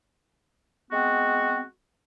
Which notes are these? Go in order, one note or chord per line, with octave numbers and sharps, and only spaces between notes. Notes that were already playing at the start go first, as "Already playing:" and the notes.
G#3 B3 C4 F#4